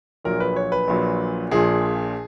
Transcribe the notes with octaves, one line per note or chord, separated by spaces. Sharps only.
A#1 A#2 F#3 A#4
B4
C#5
B4
A#1 A#2 F#3
A#1 A#2 F3 G#4